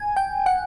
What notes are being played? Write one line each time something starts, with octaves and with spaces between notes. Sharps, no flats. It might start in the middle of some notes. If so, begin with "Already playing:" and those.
Already playing: G#5
G5
F#5